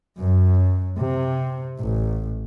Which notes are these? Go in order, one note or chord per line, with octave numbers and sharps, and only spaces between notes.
F#2
C3
A1